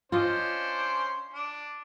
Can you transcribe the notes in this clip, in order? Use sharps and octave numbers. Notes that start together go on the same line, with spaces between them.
C#4 D4 F4 C5 D#5
D4